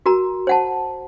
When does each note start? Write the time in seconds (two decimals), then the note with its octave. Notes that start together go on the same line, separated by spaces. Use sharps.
0.06 F#4 A#4 A#5
0.47 C5 F#5 A5